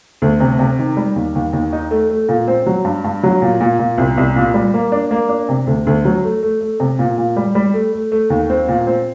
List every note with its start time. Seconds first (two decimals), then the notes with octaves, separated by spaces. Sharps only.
0.22 D2
0.40 C3
0.59 C3
0.79 D#3
0.97 G3
1.16 D#2
1.35 D#2
1.53 D#2
1.73 D#4
1.91 A3
2.10 A3
2.29 A#2
2.48 C4
2.66 F#3
2.85 G2
3.04 G2
3.23 F#3
3.42 A#2
3.61 A#2
3.79 A#2
3.98 C2
4.17 C2
4.36 A#2
4.54 G3
4.74 A#3
4.92 D4
5.11 A#3
5.29 D4
5.49 C3
5.67 D2
5.87 D2
6.05 F#3
6.24 A3
6.43 A3
6.61 A3
6.80 C3
6.99 A#2
7.18 A#2
7.37 G3
7.55 G3
7.74 A3
7.93 A3
8.12 A3
8.30 D#2
8.50 C4
8.68 A#2
8.87 C4